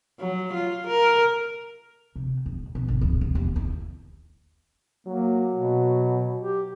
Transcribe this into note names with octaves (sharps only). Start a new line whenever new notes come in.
F#3
F4
A#4
C3
D#1
B2
G#1
D1
C2
D#2
E4
F#3 A#3
B2
G4